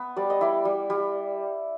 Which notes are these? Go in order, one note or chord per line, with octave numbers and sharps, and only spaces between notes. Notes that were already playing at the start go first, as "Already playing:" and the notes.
Already playing: B3
G3 D5
D#5
E4 D5
G3
G3